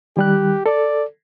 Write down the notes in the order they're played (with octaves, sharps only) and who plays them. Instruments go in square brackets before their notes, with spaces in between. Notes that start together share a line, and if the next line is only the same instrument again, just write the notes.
[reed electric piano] D#3 G3 F#6 [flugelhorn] G4
[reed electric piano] A4 [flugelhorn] D5